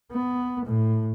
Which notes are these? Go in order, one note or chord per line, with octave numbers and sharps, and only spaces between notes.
B3
A2